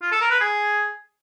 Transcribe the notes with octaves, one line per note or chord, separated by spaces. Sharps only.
F4
A4
A#4
B4
G#4